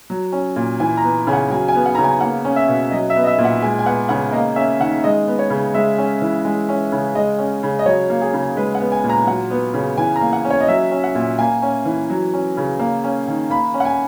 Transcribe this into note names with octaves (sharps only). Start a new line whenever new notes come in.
F#3
C#4
A#2
E3 G#5
A#5
B3
C#3 G#5
F#5
F#3 G#5
G#5
B3
F#5
C#3 A#5
G#5
A#3 F#5
C#4
E5
B2
F#3 D#5
E5
B3
D#5
E5
A#2
F#5
G#3 G#5
G#5
B3 F#5
C#3 F#5
A#3 D#5
C#4 E5
D#3 F#5
G#3 D#5
B3
C#5
C#3
G#3 E5
C#4
E3
G#3
C#4
C#3
G#3 D#5
C#4
C#3
D#5
F#3 C#5
A#3
G#4
C#3
G#3 B4
F#5
B3
G#5
A#2
A#5
F#3 F#5
B3
C#3
E3 G#5
A#5
A#3
F#5
C#4
C#5
D#5
F#3 E5
C#4
F#5
A#2
A#3 G#5
C#4
E3
F#3
C#4
C#3
A#3
C#4
D#3
A#3 B5
C#4
F#5
G#5